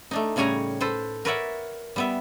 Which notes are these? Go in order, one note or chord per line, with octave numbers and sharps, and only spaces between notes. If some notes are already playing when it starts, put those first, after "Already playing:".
A3 D4 D#4
A2 C#3 G3 C#5 G#5 A#5
A4 B4 C5
A#4 B4 C#5 D5 E5 F#5
G3 B3 E5